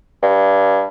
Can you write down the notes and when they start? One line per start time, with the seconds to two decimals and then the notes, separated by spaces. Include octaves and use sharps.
0.23 G2